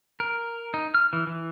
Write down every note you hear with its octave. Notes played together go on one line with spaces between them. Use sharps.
A#4
D#4
F6
E3
E3